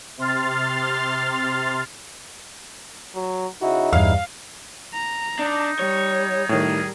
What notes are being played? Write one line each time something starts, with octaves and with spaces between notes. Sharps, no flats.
C3 C6 F6 A6
F#3
C#3 D#4 E4 F#4
E2 G2 G3 F5
A#5
D4 D#4
G3 C#5
A2 D#3 G3 G#4 A#4